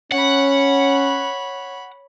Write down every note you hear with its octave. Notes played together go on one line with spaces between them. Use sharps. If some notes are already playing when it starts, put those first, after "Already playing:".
C#4 C#5 F#5 B5